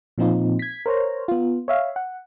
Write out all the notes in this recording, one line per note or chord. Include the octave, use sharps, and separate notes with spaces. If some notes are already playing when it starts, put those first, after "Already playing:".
A#2 F3 C4 D#4 F4
G#6 B6
A#4 C5 C#5 A#5
B3 F4
C#5 E5 F5
F#5